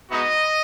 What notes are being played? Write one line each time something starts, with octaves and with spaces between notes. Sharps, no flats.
G#3 B3 D#4 F#4 D#5